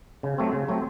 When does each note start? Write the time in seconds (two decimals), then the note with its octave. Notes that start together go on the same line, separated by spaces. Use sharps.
0.23 C#3
0.38 F#3 A3 C4
0.53 C#3
0.68 F#3 A3 C4